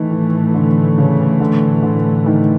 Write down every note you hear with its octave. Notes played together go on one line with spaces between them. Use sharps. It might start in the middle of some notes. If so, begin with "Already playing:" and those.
Already playing: A2 D#3 E3 A3
D#3
D3
C#3
D3
D3
D#3